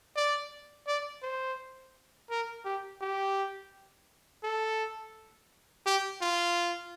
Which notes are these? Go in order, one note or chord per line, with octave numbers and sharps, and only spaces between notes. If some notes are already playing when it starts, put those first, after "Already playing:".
D5
D5
C5
A#4
G4
G4
A4
G4
F4